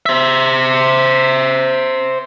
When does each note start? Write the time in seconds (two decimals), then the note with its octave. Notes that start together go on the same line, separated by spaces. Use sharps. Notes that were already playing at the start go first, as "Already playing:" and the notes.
0.06 C5 E5